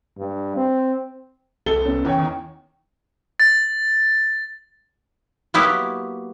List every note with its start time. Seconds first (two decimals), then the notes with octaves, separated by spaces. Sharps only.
0.18 G2
0.56 C4
1.66 C2 A4 G7
1.86 B3 C#4
2.05 E2 E3 C#5 G5
2.18 D#3
3.40 A6
5.54 F#3 A#3 B3 E4 G4